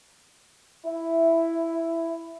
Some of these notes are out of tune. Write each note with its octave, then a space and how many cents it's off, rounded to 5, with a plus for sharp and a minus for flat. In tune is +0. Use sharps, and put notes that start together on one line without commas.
E4 +5